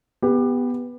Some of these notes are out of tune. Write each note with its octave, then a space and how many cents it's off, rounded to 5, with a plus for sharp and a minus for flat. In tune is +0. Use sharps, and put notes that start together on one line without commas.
B3 +0 G4 +20